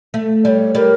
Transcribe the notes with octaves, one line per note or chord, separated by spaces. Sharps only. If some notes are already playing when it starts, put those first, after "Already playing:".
A3
G3 C#5 D5
G3 A#4